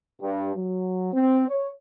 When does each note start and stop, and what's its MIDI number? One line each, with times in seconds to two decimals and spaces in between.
0.22 0.52 43
0.55 1.12 54
1.13 1.48 60
1.49 1.70 73